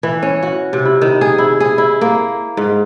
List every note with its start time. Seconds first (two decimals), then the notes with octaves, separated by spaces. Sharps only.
0.03 E3
0.22 C#4
0.43 F#4
0.73 C3
0.85 E4
1.01 D#3
1.21 G#4
1.38 E4
1.60 G#4
1.78 E4
2.01 A#3
2.57 G#2